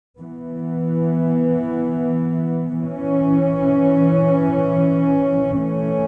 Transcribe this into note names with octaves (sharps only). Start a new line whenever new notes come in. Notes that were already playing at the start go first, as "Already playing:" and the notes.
E3 B3
E3 C#4
E3 A3 C#4